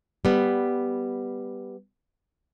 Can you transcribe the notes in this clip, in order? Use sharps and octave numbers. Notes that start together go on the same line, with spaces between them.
G3 B3